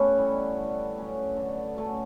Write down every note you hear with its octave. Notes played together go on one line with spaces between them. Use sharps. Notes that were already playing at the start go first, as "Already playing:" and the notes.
Already playing: A3 B3 C#4 G4 A4 B4 C#5
E3 G3
D3
F#3 A3 C#4
D3
F#3 A3 C#4